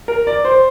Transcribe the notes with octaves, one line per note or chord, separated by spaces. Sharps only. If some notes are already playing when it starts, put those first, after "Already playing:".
A#4
D5
C5